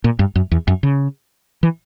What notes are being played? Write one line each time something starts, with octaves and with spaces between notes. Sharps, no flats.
A#2
G2
F#2
E2
F#2
C#3
E3